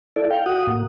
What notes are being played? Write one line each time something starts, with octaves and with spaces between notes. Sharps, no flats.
E4 A4 D5
F5 G5
F#4 F#5 D#6
A2 A#3